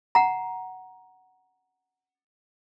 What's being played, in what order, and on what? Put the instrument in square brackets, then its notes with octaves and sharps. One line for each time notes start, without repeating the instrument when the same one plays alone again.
[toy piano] F#5 A#5